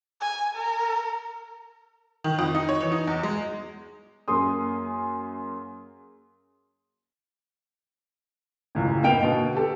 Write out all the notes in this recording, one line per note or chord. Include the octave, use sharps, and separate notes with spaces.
G#5
A#4
D#3
F2
D#4
C#5
E3
D#4
E2
G#3
F#2 A#3 G#4 C6 D#6
F#1 C#2 A2
A#3 B3 D#4 G5 D7 F7
B2 D3
G4 A4